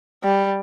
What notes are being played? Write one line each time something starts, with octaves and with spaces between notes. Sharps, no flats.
G3